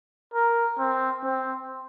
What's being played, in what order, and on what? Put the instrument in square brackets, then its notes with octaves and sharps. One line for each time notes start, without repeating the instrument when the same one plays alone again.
[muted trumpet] A#4
C4
C4